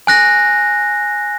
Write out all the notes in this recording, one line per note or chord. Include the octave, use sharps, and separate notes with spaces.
G#5 F#6 A#6